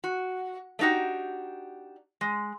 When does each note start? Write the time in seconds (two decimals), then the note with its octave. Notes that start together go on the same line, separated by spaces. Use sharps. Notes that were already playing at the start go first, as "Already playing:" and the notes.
0.04 F#4
0.79 A3 D4 D#4 F#4 G4
2.21 G#3